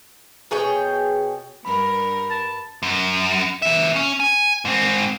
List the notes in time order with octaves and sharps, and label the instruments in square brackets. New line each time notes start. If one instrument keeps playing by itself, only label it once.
[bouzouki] B2 G#4 C#5 G5
[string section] G2 A#4 [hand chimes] B5
[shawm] A5
[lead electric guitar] F#2
A#2 E5
C#4
G#5
G#2 C4